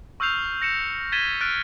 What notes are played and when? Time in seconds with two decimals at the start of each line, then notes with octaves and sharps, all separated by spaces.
0.20 C#6 E6 F6 G6 C7 F7
0.62 A#6 C#7 E7
1.12 G#6 A6 B6 D#7 E7 G7
1.41 F6 F#6 A6 D7